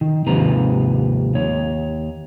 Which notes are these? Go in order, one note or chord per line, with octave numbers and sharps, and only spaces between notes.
D#3
D#2 G#2 C3 F3 B4 A#5
D#2 C#5